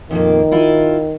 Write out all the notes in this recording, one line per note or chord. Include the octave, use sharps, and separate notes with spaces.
F2 A#2 D#3 A#3
E4 F4